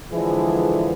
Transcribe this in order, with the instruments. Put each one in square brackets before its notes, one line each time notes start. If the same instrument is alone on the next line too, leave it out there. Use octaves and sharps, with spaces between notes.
[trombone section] D3 E3 F3 G#3 E4 G#4